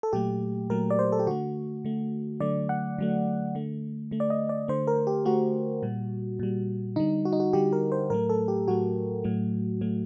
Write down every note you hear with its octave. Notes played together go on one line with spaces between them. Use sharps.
A4
A#2 F#3 A3 G4
A#2 F#3 A3 A#4
D5
C5
A4
G4
D3 A3 F#4
D3 A3
D3 F#3 A3 D5
F#5
D3 F#3 A3
D3 A3
D3 A3
D5
D#5
D5
D3 A3 C5
A#4
G4
D3 A3 F#4
A#2 G3
A#2 G3
D3 G3 D#4
F#4
D#4
F#4
D3 G3 G4
A#4
C5
A2 F#3 A3 A#4
A4
G4
A2 F#3 A3 F#4
A2 F#3 A3
A2 F#3 A3